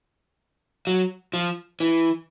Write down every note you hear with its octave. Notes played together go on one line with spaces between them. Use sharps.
F#3
F3
E3